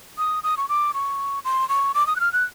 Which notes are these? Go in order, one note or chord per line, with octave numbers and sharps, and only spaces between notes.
D#6
D#6
C#6
D6
C#6
C6
C#6
D6
D#6
F#6
F6
F#6